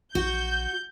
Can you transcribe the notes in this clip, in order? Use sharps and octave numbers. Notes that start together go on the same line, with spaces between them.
A#1 F#4 G6